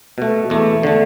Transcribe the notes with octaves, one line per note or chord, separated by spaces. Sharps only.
B2 A3
E2 A3
D3 A3